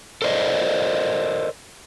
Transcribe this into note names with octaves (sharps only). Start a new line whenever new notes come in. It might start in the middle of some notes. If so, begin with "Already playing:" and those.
A4 A#4 C5 D5 D#5